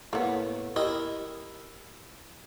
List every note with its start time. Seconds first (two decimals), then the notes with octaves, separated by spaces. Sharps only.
0.13 A2 A#3 B3
0.76 E4 G4 A#4 D#5